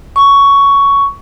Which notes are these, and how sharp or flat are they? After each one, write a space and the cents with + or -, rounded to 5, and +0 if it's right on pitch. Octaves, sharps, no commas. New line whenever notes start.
C#6 +10